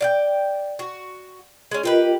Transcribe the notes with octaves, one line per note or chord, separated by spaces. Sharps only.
D5 F5 G5
F#4
G#3 C#4
A#3 F4 G4 A#4 B4 D#5